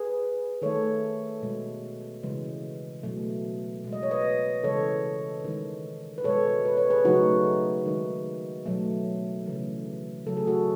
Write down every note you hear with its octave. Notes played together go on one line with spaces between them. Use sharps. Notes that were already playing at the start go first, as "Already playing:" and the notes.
Already playing: G#4 B4
D#3 A3 A4 C#5
B2 G#3
C#3 E3 G#3
B2 F#3 A3
B2 G#3
D#5
C#5
B4 D#5
C#3 E3 G#3 A4 C#5
D#3 G#3
B4
B2 G#3 A4 C#5
B4
C#5
G#4 B4
C#3 F#3 A3 D#4 F#4
D#3 G#3
B2 F#3 A3
C#3 E3 A3
C#3 F#3 A3 A4
G#4
F#4 A4